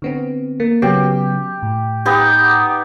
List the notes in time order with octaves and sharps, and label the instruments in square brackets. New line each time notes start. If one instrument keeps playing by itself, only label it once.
[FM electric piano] D3 B3 C4
A#3
[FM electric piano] C#3 F#3 B3 [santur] G4
[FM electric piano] A2
[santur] B3 D#4 G4